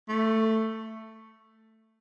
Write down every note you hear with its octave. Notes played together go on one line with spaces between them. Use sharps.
A3